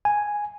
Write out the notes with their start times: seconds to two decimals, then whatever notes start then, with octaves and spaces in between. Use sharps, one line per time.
0.05 G#5